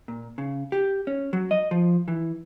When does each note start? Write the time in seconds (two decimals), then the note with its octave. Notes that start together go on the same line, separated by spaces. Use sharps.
0.08 A#2
0.38 C#3
0.72 G4
1.07 C#4
1.33 F#3
1.51 D#5
1.71 F3
2.08 E3